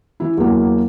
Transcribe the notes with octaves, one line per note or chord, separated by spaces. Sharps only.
E3 E4
E2 F#3 A#3